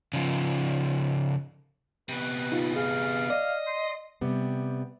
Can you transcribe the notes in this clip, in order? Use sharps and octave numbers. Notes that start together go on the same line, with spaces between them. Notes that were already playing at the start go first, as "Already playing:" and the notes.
C#3 F3
C3 B3 B4
D#4 F4
G#4 F5
D5 D#5
C6
C3 G3 B3